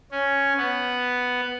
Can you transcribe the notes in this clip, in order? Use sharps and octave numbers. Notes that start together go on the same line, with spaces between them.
C#4
B3